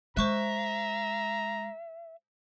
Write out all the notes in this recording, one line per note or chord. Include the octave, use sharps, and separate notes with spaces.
G#3 C5 E5 A#5 C#6 F#6